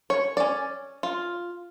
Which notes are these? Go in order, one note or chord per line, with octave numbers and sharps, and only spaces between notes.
C#5
C#4 D5
F4